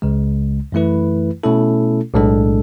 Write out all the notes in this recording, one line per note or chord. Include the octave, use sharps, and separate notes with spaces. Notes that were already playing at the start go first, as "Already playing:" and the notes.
C#2 C#3 G#3
F#2 E3 A3 E4 B4
B2 A3 C#4 E4 A4
B1 A2 G#3 D4 A4